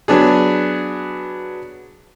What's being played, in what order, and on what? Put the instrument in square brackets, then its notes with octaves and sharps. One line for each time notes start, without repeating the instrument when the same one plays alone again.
[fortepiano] F#3 B3 D4 G#4